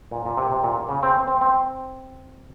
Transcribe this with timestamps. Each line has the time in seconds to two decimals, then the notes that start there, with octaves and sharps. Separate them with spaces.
0.11 A#2
0.26 A#2
0.37 C3
0.51 C3
0.63 A#2
0.89 C#3
1.03 C4
1.28 C4
1.41 C4